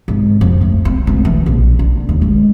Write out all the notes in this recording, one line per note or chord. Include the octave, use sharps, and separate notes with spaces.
G#1
F2
A3
C4
D2
E3
A#1
D3
D#2
G#3